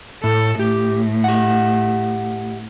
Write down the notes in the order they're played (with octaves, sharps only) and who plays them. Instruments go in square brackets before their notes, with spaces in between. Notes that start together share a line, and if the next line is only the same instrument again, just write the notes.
[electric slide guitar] A2 [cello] A4
[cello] A2 [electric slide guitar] G4
[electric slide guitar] G4 F#5